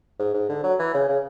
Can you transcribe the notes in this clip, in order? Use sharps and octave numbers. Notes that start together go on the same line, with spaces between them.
G#2
G#2
D3
F#3
E3
C#3
C#3